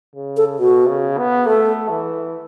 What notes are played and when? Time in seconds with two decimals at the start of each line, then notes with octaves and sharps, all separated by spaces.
0.15 C#3
0.37 A4
0.59 B2 F#4
0.87 C#3
1.18 B3
1.46 A3 A4
1.89 E3